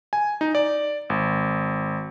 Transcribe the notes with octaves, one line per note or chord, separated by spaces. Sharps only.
G#5
D#4
D5
G#1